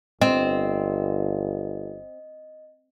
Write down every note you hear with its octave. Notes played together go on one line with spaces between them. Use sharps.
G1 C4 D#5